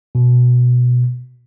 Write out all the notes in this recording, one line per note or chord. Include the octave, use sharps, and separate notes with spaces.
B2